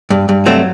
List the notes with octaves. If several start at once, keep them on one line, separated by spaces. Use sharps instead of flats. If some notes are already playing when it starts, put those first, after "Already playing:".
G2
G2
F#3 A3 C4